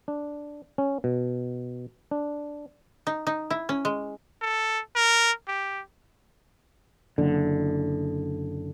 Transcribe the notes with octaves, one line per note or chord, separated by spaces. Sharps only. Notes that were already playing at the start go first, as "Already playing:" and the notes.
D4
C#4
B2
D4
D#4
D#4
E4
C#4
G#3
A4
A#4
G4
F#1 D3